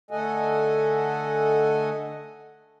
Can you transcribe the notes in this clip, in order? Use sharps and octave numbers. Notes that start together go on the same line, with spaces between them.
D3 A3 A4 D#5 F#5 G#5